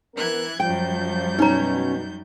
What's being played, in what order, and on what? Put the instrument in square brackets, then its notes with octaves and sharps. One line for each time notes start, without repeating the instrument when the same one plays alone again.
[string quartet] E3 F#6 G#6 [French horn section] B3 A#4
[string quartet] F#2 G3 G6 [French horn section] F3 [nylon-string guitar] G5
[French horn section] B2 [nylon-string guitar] C#4 C#5 [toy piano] D#4 A#5